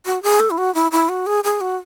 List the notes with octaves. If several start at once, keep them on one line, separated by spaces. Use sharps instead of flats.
F#4
G#4
A4
E4
F#4
E4
E4
F#4
G#4
G#4
F#4